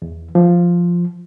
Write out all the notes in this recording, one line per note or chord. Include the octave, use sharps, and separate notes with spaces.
E2
F3